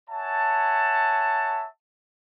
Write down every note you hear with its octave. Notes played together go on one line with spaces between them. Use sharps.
C#5 E5 F#5 G#5 A5